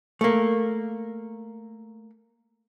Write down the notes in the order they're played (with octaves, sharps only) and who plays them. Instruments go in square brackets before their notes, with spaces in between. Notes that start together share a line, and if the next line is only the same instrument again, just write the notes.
[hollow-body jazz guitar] A3 A#3